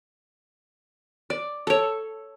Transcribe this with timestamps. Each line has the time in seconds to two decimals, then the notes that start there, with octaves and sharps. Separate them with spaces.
1.30 D5
1.67 A4 C#5